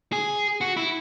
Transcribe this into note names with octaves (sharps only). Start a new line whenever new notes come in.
G#4
F#4
E4